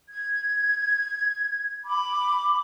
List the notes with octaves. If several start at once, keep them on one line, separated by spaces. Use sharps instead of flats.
G#6
B5 D6